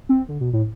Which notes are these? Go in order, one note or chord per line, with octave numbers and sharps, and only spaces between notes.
C4
D3
B2
A2